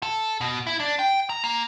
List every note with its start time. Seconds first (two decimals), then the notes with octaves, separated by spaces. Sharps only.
0.03 A4
0.41 B2
0.67 E4
0.80 D4
0.99 G5
1.30 A#5
1.44 A#3